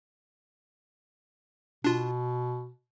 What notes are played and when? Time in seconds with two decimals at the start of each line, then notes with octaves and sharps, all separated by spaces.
1.84 B2 D4 F4